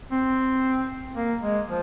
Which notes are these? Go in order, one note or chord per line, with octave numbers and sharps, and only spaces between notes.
C4
A#3
G#3
F3